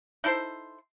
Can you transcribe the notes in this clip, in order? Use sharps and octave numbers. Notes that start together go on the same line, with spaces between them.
D#4 E4 A4 C5